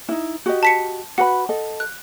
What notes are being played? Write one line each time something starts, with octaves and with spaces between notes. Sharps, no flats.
D#4 E4
F#4 G4 D#5
A5 B6 C#7
F#4 B4 F#5 B5
A4 D#5
F#6